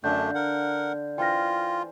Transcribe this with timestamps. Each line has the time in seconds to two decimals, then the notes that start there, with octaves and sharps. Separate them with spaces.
0.04 F#2 D3 A3 D4 F5 G6
0.35 A#4 F#5
1.18 E3 F4 C5 G5 F6 A#6